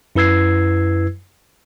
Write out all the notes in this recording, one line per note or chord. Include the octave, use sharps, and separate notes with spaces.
F#2 E4 B4 E6 G#6 C7